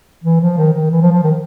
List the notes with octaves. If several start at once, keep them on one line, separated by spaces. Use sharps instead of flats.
E3
F3
D#3
D#3
E3
F3
F3
D#3